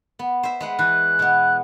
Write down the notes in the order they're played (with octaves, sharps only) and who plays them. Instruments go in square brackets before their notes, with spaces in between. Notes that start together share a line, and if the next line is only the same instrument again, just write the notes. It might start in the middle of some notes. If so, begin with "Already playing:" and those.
[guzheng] B3
C5 E5
G#3 B4 F#5
[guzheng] E3 [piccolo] F#6
[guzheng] B2 B3